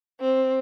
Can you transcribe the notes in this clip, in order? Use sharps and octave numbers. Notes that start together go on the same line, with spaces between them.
C4